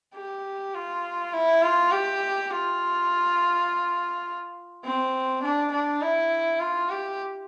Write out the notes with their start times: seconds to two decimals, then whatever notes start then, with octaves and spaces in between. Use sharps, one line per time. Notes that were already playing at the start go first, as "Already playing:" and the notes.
0.15 G4
0.74 F4
1.33 E4
1.62 F4
1.92 G4
2.50 F4
4.85 C4
5.43 D4
5.72 D4
6.01 E4
6.60 F4
6.90 G4